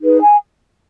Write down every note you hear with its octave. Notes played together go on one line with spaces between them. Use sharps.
D#4 G#4 B4
G#5